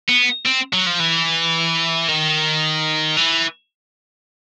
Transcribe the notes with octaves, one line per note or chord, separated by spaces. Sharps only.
B3
C4
F#3
F3
E3
D#3
E3